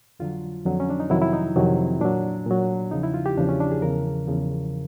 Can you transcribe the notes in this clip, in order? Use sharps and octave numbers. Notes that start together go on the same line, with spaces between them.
F2 D3 F#3 F4
F2 D3 F#3
C#4
D4
D#4
F2 C3 D#3 F#3 E4
E4
D#4
F2 C3 D#3 F#3
A#2 F#3 D4
A#2 F#3
E2 C#3 F3 D#4
E4
F4
G4
E2 C#3 F3 D4
C#4
D4
G#4
E2 C#3 F3 A#4
E2 C#3 F3